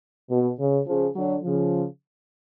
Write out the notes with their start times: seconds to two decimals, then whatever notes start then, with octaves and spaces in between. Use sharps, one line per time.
0.30 B2
0.60 C#3
0.87 C#3 F3
1.16 D3 F#3
1.44 C#3 F3